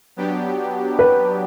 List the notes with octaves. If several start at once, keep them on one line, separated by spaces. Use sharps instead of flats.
F#3 B3 D4 G4
B4